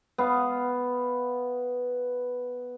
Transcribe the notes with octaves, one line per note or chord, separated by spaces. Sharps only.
B3 F5